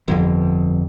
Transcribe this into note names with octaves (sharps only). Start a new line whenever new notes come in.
G1 F2